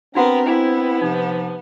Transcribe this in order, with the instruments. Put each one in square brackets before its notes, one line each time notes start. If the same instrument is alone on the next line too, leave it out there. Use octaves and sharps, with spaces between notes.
[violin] B3 A#4 [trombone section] C4 [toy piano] D4 F#4 F#5
[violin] B3 [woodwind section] E4 [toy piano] G#5
[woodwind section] C3 F3 [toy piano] D#4